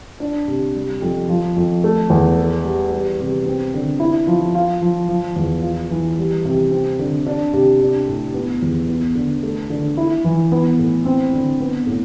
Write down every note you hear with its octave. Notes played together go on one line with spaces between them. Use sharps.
D4
C3
G3
F2
F3
F2
A3
E2
A4
G3
G3
C3
C4
D3
E4
F3
F4
F3
F3
E2
F4
E3
G3
C3
C4
D3
D4
C3
D4
A2
B3
E2
B3
D3
A3
D3
E4
E3
B3
A2
C4
D3
B3
A2